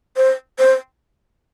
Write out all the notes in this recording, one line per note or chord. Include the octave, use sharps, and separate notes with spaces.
C5
C5